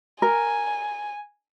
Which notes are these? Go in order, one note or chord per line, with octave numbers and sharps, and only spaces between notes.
A#4 G#5